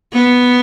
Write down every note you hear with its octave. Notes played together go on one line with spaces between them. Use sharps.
B3